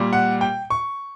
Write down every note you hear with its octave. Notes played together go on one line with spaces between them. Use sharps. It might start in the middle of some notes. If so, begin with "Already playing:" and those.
Already playing: A#2 G3 A#3
F#5
G5
C#6